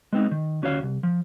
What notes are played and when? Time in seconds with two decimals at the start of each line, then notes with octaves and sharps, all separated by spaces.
0.13 G#3 B3 C4 D#4
0.31 D#3
0.62 D2 C#4 F#4 C#5 F5
0.83 C2
1.03 F3